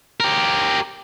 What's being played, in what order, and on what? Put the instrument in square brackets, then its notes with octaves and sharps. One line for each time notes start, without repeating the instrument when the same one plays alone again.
[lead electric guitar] G4 A#4